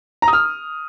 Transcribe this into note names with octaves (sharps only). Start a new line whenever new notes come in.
A#5
D#6
F6